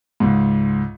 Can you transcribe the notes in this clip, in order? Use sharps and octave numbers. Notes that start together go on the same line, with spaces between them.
C#2 G#2